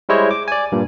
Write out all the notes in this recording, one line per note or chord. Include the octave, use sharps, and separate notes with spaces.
G3 G#3 E4 C5 C#5 D#5
D6
D5 G#5
G2 A#2